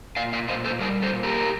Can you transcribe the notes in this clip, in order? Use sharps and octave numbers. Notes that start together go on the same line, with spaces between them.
A#2 D5 F5
D5 F5
A#2 C5 D#5
A4 C5
G3 A#4 D5
A4 C5
A#2
G4 A#4